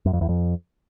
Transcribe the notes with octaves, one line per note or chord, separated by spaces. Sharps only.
F#2
F2
E2
F2